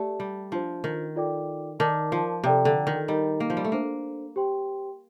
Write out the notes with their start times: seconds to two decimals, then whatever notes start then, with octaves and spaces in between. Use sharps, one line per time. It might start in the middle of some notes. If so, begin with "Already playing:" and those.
Already playing: A3 G4 D5 A5
0.20 G3
0.52 F3 D4 F4 C5
0.84 D#3
1.16 F4 A4 D5 G5 D6
1.80 D#3 A#4 D5 A5 D6
2.12 F3
2.44 C3 A4 D5 G5 A#5
2.65 D3
2.87 D#3
3.08 G3 D#4 A#4 D#5 A#5
3.40 A#3
3.50 F3
3.57 G3
3.65 A3
3.72 A#3 D4 A4 C5
4.36 G4 C5 G5 C6